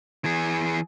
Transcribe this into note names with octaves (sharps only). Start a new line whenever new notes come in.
E3 G#4